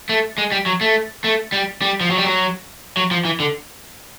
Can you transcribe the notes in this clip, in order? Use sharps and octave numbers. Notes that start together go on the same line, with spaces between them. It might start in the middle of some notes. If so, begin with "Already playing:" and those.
A3
G#3
G3
F#3
A3
A3
G3
G3
F3
F#3
G3
F#3
F#3
F3
E3
D3